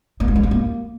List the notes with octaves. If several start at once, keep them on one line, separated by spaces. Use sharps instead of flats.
A#3
G#3
F3
F#3
A#3